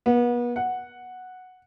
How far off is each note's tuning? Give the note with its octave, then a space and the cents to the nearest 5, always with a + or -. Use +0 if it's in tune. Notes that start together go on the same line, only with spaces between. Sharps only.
B3 -35
F#5 -5